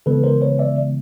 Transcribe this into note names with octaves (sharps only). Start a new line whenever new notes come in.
C#3 E3 G#3 B3 A4 B4
A#4 C5
B4 C#5
D5 E5